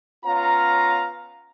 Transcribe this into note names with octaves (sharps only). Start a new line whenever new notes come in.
B3 C#4 F4 C#5 F5 A#5